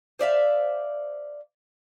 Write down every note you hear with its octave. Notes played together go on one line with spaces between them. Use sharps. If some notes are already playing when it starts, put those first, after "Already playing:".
C5 D5 E5 F5